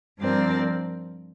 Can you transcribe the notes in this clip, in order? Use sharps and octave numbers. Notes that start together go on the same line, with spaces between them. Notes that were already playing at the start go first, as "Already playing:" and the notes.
G2 F3 C4 A#4 D5